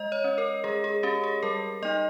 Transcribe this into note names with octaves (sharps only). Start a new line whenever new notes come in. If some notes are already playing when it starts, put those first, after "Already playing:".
Already playing: G#3 D#5
C#5
C#4
A#4
G#3 G#4
G#4
C#4 G4
G#4
G3 A#4
A#3 D#4 D#5